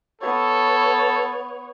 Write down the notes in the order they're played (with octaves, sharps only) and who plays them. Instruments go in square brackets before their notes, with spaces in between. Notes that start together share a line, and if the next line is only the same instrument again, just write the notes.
[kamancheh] B3 C#5 [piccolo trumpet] A4